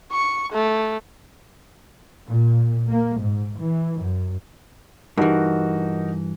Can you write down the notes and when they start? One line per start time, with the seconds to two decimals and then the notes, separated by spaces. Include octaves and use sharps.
0.12 C#6
0.52 A3
2.26 A#2
2.89 A#3
3.21 G#2
3.58 E3
3.99 F#2
5.17 G2 E3 D#4 F#4 A#4